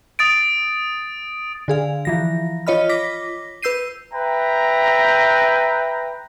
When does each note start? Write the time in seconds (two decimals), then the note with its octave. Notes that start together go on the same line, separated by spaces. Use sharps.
0.19 D#6 A6 D7
1.68 D3 G#4 F5
2.05 E3 F3 A#6
2.67 F4 C#5 D#5 B5 F6
2.89 D6 A#6 B6
3.63 B4 E6 G6 C7 D#7
4.13 B4 E5 G5 A#5